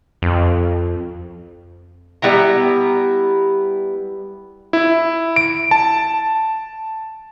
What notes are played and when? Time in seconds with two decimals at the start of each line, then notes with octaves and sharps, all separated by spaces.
0.22 F2
2.22 G3 B3 E4 A#5
4.73 E4
5.36 D7
5.71 A5